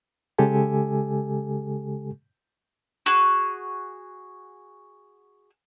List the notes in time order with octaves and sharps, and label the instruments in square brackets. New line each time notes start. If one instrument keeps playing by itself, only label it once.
[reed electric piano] C#3 G#3 G4 A4 G#5
[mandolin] F#4 G#4